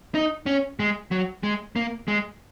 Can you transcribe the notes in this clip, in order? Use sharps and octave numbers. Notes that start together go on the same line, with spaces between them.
D#4
C#4
G#3
F#3
G#3
A#3
G#3